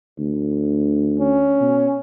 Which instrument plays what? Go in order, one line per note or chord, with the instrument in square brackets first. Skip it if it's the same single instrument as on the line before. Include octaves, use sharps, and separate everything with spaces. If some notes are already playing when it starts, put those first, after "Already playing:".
[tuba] D2
[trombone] C#4
[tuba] B2